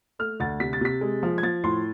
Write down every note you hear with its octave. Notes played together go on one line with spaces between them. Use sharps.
A3 F6
D2 A6
C3 B6
A6
C3 B6
G#3
F3
G#6
F3 A6
A2 C6